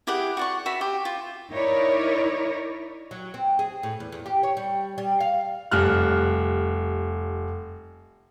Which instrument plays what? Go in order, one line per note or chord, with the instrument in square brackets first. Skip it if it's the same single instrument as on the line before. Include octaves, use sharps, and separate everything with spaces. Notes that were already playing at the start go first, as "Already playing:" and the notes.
[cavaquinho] E4 G4 G#4 F#5
F#4 D5 C#6
F#4 E5 B5
G4
F4
[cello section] D#4 E4 A#4 C#5 D5
[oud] F#3
C4
G#4
A2
E2
E2
G4
C#5
G3
G3
F5
[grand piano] F1 G3 F6 F#6